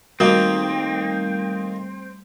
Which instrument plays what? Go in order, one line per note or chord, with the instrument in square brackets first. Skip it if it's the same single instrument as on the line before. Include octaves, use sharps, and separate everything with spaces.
[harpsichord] D#3 A#3 D#4 [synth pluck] G3 A3 [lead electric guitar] C4 [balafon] F#4